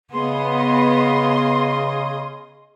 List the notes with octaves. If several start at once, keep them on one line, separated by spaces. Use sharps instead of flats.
C#3 B3 G#4 D#5 C6